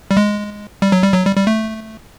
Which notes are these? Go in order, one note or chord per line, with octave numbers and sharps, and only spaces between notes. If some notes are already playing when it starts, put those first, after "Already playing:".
G3
G#3
G3
F#3
G3
F#3
G3
G3
A3